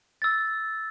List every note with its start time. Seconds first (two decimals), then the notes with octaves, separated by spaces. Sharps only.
0.22 E6 A6